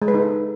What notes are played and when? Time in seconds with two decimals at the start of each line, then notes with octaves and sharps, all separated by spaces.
0.02 G#3
0.08 B4
0.14 D#4
0.21 A4